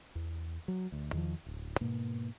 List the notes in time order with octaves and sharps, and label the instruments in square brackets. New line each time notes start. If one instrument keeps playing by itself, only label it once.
[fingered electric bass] E2
F#3
D2
E2 D#3 F3
D1
G#2 B2 A#3